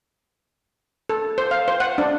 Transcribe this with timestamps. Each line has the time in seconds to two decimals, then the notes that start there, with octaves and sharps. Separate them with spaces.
1.10 A4
1.38 C5
1.51 F5
1.68 C5
1.80 F#5
1.98 D4